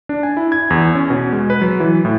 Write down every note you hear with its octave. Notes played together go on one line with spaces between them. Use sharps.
D4
G#5
E4
G#6
E2
C#4
B2
G#3
B4
F#3
E3
A2